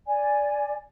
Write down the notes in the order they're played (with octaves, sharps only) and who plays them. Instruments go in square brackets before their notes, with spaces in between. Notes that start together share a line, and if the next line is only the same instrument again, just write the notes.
[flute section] D5 G#5